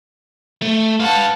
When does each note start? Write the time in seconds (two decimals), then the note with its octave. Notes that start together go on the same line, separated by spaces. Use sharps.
0.62 A3
1.00 B4 F5 F#5 A5